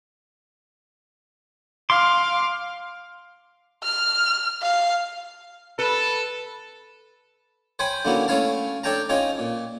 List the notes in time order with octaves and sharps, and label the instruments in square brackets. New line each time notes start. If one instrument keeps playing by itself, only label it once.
[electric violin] F5 [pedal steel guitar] C6 D6
[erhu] F6
F5
[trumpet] A4 [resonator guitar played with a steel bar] B4
[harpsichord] C5 C#5 G5 G#5 B5
D3 A#3 B3 C#4 E4 F#4
A3 C#4 E4 C#5 F5 A5
D4 A4 C#5 G5 A5 A#5
C4 C#4 D#4 F4 C#5
A#2